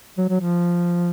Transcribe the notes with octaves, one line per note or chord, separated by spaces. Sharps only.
F#3
F#3
F3